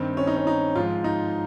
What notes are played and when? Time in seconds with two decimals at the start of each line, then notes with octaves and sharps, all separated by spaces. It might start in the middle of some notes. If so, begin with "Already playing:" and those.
Already playing: G2 D#3 C4
0.17 C#4
0.27 D#4
0.37 C#4
0.47 D#4
0.75 G#2 F3 F4
1.04 D#4